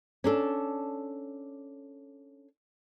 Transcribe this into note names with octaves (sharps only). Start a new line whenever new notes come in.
C#4 D4 A4